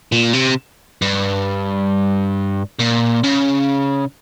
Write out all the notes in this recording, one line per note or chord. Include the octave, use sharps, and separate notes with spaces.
A#2
C3
G2
A#2
C#3